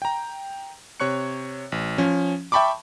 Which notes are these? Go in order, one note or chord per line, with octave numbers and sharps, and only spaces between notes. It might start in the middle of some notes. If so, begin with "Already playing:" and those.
G5 A#5
C3 C#5 C#6 F#6 C#7
A1
F3 C#4
E5 G5 A5 B5 C#6 D6